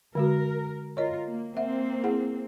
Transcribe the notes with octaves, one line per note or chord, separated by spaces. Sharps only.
D3 G#3 F#4 A#4
F4 A#4 C#5 D#5
A#3
A#3 C4 E5 F#5
E4 G#4 F#5